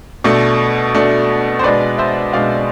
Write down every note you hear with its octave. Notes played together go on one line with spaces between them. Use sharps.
B2 A3 D4
B2 A3 D4
C5
B2 G#3 D4 B4 D5
C5 E5
B2 G#3 D4 D5 F5